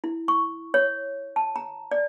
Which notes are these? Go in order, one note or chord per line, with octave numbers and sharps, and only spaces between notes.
E4
C#6
C#5
A5
A#5
D5